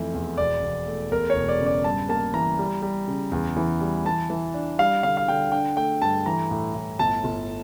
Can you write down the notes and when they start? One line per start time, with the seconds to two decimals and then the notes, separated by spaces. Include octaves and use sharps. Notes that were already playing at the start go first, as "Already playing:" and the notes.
Already playing: F2 E3 A3
0.14 E2
0.38 E1 D5
0.62 E1
0.87 A3
1.11 E2 A#4
1.30 C#5
1.35 E1
1.49 D5
1.60 C#3
1.66 D5
1.84 G2 A5
2.09 A#3 A5
2.34 E3 A#5
2.59 G3
2.82 G3
3.08 C#3
3.32 E2
3.57 E3
3.80 G3
4.05 E3 A5
4.30 E3
4.54 D4
4.79 G3 F5
5.03 D3 F5
5.17 F5
5.28 D3 G5
5.52 D4 G5
5.76 A3 G5
6.02 G2 A5
6.26 E3 A#5
6.51 A2
6.75 A2
6.99 G1 A5
7.24 G1